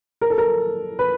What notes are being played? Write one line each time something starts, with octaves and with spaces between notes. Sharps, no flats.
A#4
A4
A#4
B4